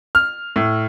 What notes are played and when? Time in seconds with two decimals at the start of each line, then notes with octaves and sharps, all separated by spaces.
0.15 F6
0.56 A2